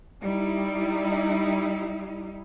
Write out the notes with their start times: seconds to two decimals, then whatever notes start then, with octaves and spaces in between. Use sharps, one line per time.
0.22 G3 D#4 E4